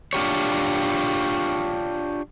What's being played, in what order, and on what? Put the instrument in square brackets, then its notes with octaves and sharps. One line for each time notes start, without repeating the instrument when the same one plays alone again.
[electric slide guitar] D4 F4 G4 C#5